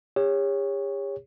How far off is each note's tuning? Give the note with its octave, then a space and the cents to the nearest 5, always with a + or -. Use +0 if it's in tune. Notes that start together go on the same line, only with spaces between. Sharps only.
G4 +45 C#5 +0